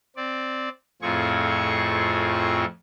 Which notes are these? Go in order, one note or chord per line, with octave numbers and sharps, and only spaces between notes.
C4 D5
F2 A2 C4 F4 G#4 C#6